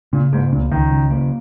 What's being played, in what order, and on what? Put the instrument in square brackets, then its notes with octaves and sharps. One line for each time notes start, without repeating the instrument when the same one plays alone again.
[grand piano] A#2 [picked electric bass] C#3
[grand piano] G#2 [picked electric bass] A#3
[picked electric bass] C#2 [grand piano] A#2
[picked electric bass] C#2 [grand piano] D#3
[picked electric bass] C#3
A#3